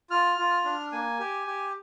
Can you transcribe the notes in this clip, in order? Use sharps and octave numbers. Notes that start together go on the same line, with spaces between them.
F4 F6
F4
D4
A#3 G#5
G4
G4